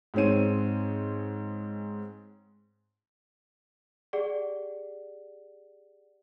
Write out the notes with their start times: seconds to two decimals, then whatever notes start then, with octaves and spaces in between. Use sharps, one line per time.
0.14 G#2 G#3 C4 C#5 D#7
4.13 G4 G#4 D5 F#5